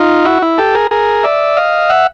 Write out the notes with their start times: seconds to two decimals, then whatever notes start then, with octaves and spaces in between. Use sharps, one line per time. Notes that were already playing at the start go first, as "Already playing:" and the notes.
Already playing: D#4 F4
0.25 E4 F#4
0.42 E4
0.58 G4 A4
0.74 G#4 A#4
0.91 G#4 A#4
1.23 D5 E5
1.57 D#5 F5
1.89 E5 F#5